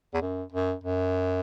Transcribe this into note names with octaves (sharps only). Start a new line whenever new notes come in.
E2
F#2
F#2
F#2